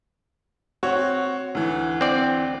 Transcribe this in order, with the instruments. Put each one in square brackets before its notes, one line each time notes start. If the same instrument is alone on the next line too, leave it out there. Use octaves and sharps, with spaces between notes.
[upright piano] C4 F#4 C#5
D2 E3
[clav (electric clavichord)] C4 D5